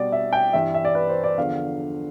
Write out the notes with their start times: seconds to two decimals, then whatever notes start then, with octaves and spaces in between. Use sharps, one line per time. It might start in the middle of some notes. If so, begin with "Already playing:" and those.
Already playing: B2 G3 D5
0.12 E5
0.33 G5
0.53 G2 E3 G3 E5
0.74 E5
0.85 D5
0.95 B4
1.09 C5
1.24 D5
1.37 E2 D3 F3 F5